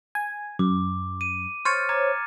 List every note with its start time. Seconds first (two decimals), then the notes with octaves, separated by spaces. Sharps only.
0.15 G#5
0.59 F#2 D6
1.21 D#7
1.65 C5 C#5 F6 A6 C#7
1.89 A#5 D6 G#6